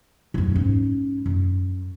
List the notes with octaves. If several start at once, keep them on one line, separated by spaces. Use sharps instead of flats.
D#1 F#2
G#2 C#4
F#2